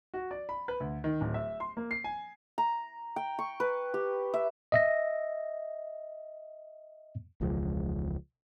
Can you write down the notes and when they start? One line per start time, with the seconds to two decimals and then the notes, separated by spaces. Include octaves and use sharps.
0.14 F#4
0.31 D5
0.49 B5
0.68 B4
0.80 D2
1.04 D#3
1.21 D1
1.34 E5
1.60 C6
1.77 A#3
1.91 C7
2.04 G#5
2.58 A#5
3.16 G5
3.39 C#6
3.60 B4
3.94 G4
4.34 E5
4.72 D#5 E5 A#6
7.41 E1 C#2 F3 G#3